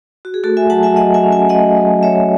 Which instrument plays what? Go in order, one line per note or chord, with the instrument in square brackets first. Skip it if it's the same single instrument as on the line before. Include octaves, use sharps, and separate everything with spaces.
[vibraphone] F#4
G#4
A3 F#4 A4
E5 G#5
F#3 F#5 A5
E5 G#5
F#3 D#5 F#5
E5 G#5
C#4
E5 G#5
A3 D#5 F#5
F#3
F#3 C#5 E5